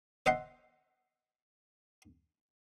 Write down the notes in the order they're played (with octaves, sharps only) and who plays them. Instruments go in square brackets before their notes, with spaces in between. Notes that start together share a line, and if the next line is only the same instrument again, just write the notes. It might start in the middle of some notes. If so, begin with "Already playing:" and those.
[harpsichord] C5 D#5 E5 F#5 C6